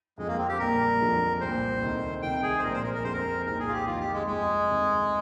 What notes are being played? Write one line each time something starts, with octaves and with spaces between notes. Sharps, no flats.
F2 D3 F3 G#3
A#3
C4
G4
A#1 A#2 G3 A#3 D4 A#4
F2 D3 F3 G#3 D4
C2 A#2 G3 C4 C5
D2 C3 D#3
C2 C3 D#3 G5
G#4
C5
A#1 A#2 G#3 D4 A#4
C5
A#4
A#4
F2 D3 G#3 C4 C5
A#4
C2 A#2 G#3 C4 D#4 A#4
G#4
F4
G4
F2 D#3 A#3 D#4 F4
G4
G#3
G1 F2 C3 F3 G#3
D2 C3 D#3